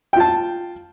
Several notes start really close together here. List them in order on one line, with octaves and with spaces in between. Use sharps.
G5 F4 A5